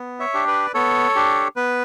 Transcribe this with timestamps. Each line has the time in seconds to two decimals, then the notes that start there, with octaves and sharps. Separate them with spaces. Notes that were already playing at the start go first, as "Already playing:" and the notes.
Already playing: B3
0.20 C#5 E5
0.34 D4 G4
0.47 B4 D5
0.74 B3 A4 C#5
1.15 D4 G4
1.56 B3 B4